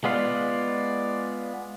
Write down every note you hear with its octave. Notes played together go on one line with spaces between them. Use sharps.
G#3 B3 F4 D5